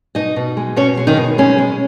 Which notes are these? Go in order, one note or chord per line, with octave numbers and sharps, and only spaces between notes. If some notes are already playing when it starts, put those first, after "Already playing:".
B2 D#4 D#5
B2
G#3
B2 C#4 C#5
G#3
D#3 D#4
B2
G#3 C#4
G#3